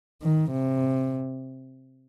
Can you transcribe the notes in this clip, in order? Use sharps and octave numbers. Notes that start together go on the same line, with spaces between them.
D#3
C3